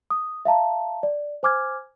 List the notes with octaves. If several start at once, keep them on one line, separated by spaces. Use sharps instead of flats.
D#6
E5 F5 A5 A#5
D5
C5 G#5 D6 F6 G#6